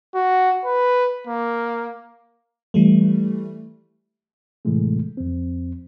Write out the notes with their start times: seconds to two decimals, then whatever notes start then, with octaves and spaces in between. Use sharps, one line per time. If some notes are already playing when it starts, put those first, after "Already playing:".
0.15 F#4
0.65 B4
1.27 A#3
2.74 E3 G3 A3
4.65 A2 C3 E3 G#3 A3
5.17 F2 C4